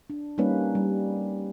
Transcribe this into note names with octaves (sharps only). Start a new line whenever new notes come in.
D4
G3 A#3 C#4 D#4 B4
G3